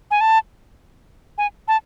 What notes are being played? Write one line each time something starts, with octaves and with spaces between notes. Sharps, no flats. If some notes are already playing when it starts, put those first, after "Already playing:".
G#5
A5
G#5
A5